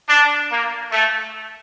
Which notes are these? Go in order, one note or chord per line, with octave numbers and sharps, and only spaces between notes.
D4
A#3
A3